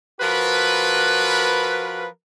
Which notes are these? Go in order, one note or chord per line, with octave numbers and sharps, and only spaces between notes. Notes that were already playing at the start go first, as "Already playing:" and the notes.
F3 F#4 A#4 B4